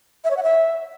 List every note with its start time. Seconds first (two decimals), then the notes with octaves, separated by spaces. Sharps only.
0.24 E5
0.31 C#5
0.37 F#5
0.43 E5